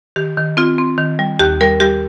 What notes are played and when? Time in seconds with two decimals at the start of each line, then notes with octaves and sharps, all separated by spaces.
0.16 D#3 G4
0.37 D#3
0.57 C4 F4
0.78 C4
0.98 D#3
1.19 G3
1.39 D#2 G4
1.61 G3 A#4
1.80 G3 G4